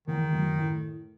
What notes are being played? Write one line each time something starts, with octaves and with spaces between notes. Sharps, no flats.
E2 D#3
F#2
A2